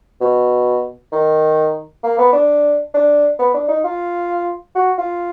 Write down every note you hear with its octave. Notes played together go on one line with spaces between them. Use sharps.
B2
D#3
A#3
B3
D4
D4
B3
D4
D#4
F4
F#4
F4